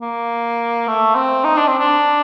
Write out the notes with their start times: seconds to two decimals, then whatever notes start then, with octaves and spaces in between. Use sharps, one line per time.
0.01 A#3
0.87 A3
1.15 C4
1.44 D#4
1.56 D4
1.67 C4
1.79 D4